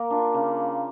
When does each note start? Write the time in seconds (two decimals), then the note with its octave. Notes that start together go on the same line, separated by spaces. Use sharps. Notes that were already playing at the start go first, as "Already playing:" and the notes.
Already playing: A#3
0.10 D4 F4
0.34 C#3